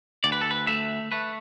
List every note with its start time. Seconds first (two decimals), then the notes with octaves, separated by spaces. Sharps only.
0.24 D2 D5
0.32 B4
0.41 A4
0.51 B4
0.67 A3 E5
1.12 A3 B4